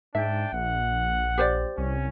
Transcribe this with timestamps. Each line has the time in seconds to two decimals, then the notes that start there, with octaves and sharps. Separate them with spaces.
0.15 G#2 D4 E5 G5 A5
0.53 A#1 F#5
1.38 G4 C5 D5
1.78 C2 C#4